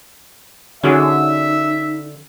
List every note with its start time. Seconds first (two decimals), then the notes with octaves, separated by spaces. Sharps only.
0.83 D3 C#4 D#4 F#4 G#4 E5